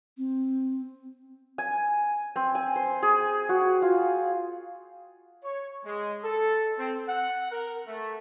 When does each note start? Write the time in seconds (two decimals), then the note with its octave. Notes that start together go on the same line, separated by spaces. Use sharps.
0.17 C4
1.58 G#5
2.36 C4
2.55 G#5
2.76 C5
3.02 G#4
3.49 F#4
3.82 F4
5.44 C#5
5.86 G#3
6.25 A4
6.78 C4
7.08 F#5
7.52 A#4
7.88 A3